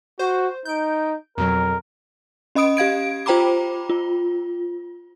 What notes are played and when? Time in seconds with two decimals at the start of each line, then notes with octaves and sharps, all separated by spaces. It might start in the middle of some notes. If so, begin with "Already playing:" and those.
0.19 F#4 C5
0.65 D#4 G6 D7
1.38 F2 B2 F#3 A#4
2.55 C#4 D#5 B5 D#6 D7
2.77 G4 F5 G#6 D7
3.26 F4 C5 G5 A#5 B5 D6
3.89 F4